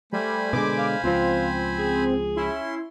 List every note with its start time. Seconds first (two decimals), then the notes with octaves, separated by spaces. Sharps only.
0.13 G3 A3 C5 G#5 B5
0.53 B2 D3 G#3 D6
0.78 F5
1.04 C#2 F3 C4 F4
1.79 G#4
2.36 C#4 E4 C6